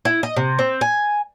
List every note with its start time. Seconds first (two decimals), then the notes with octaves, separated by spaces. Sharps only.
0.05 E4
0.23 D#5
0.36 C3
0.59 C4
0.81 G#5